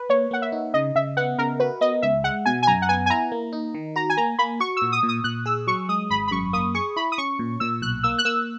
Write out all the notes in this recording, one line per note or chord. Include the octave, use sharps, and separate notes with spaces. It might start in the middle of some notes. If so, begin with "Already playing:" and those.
Already playing: B4
A#3 C#5
A#3 F#5
E5
D#4
C#3 D#5
C#3 E5
B3 F#5
C#3 A#4
F#4 B4
B3 D#5
C#2 E5
G#3 F#5
B2 G#5
G#5
F#2 A#5
F#5
B3 G#5
G#5
E4 A#5
A#3
D#4
D#3
F#4 A#5
G#5
A#3 A#5
A#3 B5
F#4 C#6
E6
A#2
D#6
A#2
D#6
A#2 F#6
G#4 E6
F#3 C#6
G#3 D#6
G#1 B5
B5
F#2 C#6
A#3 D#6
G#4 C#6
E4 B5
D#6
C#4 C#6
A#2
A#2 E6
B1 F#6
A#3 E6
F#6
A#3 E6